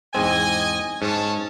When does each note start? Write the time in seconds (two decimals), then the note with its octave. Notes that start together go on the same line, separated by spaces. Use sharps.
0.15 E2 G#2 C4 D#5 G#5
1.02 G#2 C#4 C#5 A5